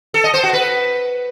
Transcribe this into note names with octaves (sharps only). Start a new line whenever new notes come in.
A4
D#5
C5
F#4
B4